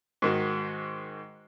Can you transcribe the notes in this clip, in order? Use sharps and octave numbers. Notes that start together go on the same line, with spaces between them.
G#2 D#3 F#4